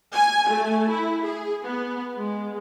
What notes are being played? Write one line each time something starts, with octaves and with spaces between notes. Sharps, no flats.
G#5
A3
E4
G#4
B3
G#3